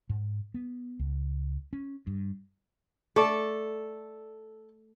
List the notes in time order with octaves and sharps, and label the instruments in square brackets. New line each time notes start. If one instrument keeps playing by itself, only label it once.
[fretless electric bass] G#2
B3
C#2
C#4
G2
[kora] A3 D5 [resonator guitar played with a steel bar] A4